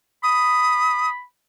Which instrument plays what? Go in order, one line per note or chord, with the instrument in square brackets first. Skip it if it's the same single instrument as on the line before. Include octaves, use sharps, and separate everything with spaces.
[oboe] B5 [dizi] D#6